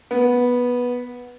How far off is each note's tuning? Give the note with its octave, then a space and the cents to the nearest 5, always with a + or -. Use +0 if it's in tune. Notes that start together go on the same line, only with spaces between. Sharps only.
B3 -10